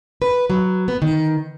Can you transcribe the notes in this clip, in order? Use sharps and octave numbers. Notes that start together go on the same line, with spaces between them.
B4
F#3
B3
D#3